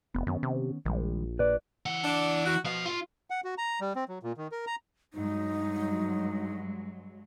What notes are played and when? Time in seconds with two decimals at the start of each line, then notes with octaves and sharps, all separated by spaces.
0.15 F1 B3
0.27 F#2 D#3 B3 C#4
0.43 C3
0.85 A#1 D#3 G3 G#3
1.39 A#2 B4 D5
1.86 E3 F#5
2.04 D4
2.46 F#4
2.65 B2 F3 F5
2.86 F4
3.30 F#5
3.44 F#4
3.58 A#5
3.81 G3
3.96 C4
4.08 F#3
4.23 A#2
4.37 D#3
4.52 A#4
4.67 A#5
5.14 G2 F#3 G#3 D#4